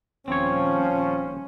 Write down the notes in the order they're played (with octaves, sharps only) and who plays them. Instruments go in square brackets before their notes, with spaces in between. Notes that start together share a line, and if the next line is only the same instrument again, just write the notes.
[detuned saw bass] D#1 [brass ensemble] F3 [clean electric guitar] C4 C#5 [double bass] C#4